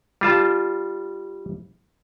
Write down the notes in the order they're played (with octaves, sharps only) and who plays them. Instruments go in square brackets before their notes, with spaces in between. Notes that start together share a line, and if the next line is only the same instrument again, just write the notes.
[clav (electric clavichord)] G3 F4 A5